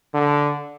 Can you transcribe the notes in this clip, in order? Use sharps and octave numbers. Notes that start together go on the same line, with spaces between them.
D3